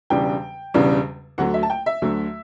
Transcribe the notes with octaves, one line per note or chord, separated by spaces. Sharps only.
E1 E2 C#3 G3 D4 G5
E1 E2 C#3 G3 D4
D2 D3 F#3 A3 F#5
E5
A5
G5
E5
D2 D3 F#3 A3